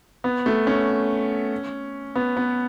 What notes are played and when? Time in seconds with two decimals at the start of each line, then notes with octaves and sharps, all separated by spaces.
0.24 B3
0.46 A3
0.67 C#4
2.16 B3
2.37 B3